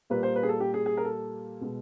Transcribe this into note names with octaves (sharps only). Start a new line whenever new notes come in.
A#2 G3 A#3 B4
C5
B4
G#4
A4
G4
G#4
G#4
A#4
A4
B2 G#3 B3